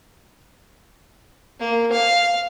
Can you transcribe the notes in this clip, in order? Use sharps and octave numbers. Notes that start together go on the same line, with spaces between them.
A#3
F5